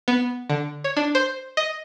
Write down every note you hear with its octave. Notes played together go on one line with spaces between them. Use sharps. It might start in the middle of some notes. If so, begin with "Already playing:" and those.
B3
D3
C#5
D4
C5
D#5